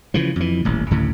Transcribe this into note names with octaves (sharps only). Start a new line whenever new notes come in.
C#3 E3 F3
F2 E3
D#1 A1
D2 A2 C#3